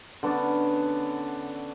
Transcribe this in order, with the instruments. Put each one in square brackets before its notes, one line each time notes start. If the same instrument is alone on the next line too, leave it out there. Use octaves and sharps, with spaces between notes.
[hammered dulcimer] D3 B3 C#4 D5